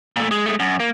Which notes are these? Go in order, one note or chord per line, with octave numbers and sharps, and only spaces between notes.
A#2 A3
G#3
G#3 A3
F#2
A#3